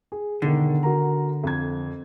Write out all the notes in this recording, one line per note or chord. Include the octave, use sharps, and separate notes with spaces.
G#4
E1 D3 D#3
F#4 A#4 A#5
F2 G#6